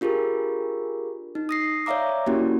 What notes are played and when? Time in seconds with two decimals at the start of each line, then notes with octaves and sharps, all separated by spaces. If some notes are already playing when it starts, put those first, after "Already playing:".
0.01 D4 F4 G4 G#4 A#4
1.35 D#4
1.49 D#6 A#6 C7
1.86 C#5 D5 E5 F5 A#5 D6
2.26 A#3 C#4 E4 F#4 G4